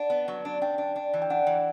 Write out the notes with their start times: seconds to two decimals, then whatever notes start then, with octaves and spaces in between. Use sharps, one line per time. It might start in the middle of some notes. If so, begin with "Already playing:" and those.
Already playing: D4 F#5
0.10 B3
0.28 F#3
0.45 D4
0.62 D4 G5
0.78 D4
0.96 D4
1.14 E3
1.22 G5
1.30 D4 F#5
1.47 E3